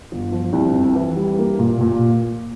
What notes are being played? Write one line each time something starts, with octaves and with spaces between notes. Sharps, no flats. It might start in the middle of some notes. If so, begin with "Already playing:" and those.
G1
F3
C2
F2
E3
G3
A#3
A#2
A#2